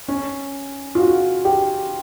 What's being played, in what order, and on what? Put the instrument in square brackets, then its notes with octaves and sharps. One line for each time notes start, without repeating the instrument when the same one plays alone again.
[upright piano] C#4
F4
F#4
G4